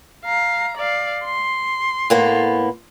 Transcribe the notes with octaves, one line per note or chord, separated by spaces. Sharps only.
F5 A#5
D5 F5
C6
A2 A#3 B3